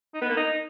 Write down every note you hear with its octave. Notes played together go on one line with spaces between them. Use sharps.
D#4
B3
A#3
D#4